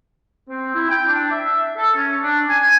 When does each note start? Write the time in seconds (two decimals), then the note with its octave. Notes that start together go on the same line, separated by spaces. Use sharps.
0.49 C4
0.76 E4
0.90 G5
1.07 D4
1.32 E5
1.77 A4
1.96 C#4
2.23 D4
2.49 G#5